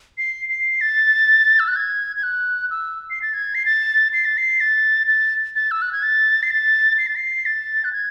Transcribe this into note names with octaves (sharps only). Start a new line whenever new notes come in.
C7
C7
A6
E6
F#6
G#6
G#6
F#6
E6
C7
A6
G#6
C7
A6
C7
A6
C7
A6
A6
A6
E6
F#6
G#6
A6
C7
A6
C7
A6
C7
A6
F#6
G#6